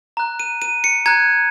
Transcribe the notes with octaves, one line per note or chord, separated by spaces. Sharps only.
A#5 F#6
D#7
D#7
C#7
A#5 F#6 G#6